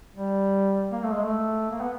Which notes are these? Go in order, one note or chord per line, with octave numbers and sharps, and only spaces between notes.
G3
A#3
A3
G#3
A3
A#3
B3